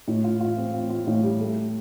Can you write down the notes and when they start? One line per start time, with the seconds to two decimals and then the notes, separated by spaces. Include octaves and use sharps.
0.07 A2
0.24 F4
0.41 F4
0.58 C4
0.74 F4
0.90 F4
1.07 A2
1.23 G3
1.41 A3